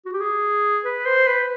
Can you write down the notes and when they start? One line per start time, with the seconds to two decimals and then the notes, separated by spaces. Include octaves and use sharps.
0.05 F#4
0.13 G4
0.20 G#4
0.85 B4
1.06 C5
1.27 B4